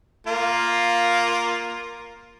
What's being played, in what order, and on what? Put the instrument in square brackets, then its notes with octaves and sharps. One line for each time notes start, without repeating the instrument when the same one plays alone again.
[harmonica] A#3 F4